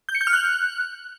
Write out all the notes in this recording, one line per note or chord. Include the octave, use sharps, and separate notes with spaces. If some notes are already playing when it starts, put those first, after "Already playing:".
G6
C#7
G6
F6
F#6